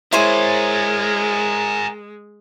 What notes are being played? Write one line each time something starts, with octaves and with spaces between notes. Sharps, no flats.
G#3 E4 A#4 C5 C#5 G#5